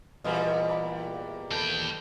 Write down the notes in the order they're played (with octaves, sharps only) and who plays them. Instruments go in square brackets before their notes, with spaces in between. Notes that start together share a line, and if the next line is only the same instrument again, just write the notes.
[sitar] E2 A#2 G3 [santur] C5 D#5
[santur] D5 A#5 B5
[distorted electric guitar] D#2 G5 [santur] A4 B4